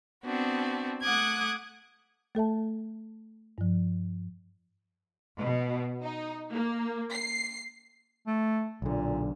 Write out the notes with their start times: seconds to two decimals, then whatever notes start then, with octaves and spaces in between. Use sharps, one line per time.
0.24 B3 C4 D4 F#4
1.02 A3 F#5 D6 D#6 F#6 G#6
2.35 A3 A4 E5 A5
3.58 G2 F3
5.41 B2
6.03 D#4
6.52 A#3
7.11 C7
8.27 A3
8.82 B1 A#2 D3